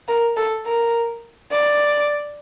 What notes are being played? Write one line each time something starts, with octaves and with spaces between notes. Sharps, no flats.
A#4
A4
A#4
D5